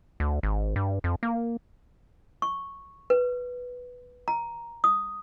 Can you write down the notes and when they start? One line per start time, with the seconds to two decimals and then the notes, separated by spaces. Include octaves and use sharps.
0.20 D2
0.43 G#1
0.76 G2
1.04 F2
1.23 A#3
2.42 C#6
3.10 B4
4.28 A#5
4.84 D#6